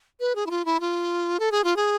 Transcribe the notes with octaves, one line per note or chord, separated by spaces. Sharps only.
B4
G#4
E4
F4
E4
F4
A4
G#4
F4
G#4